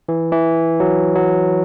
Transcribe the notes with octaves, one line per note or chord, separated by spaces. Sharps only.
E3
E3
F#3
F#3